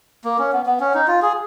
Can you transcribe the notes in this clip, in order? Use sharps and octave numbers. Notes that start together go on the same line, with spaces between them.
A#3
C#4
B3
B3
C#4
D#4
F4
G#4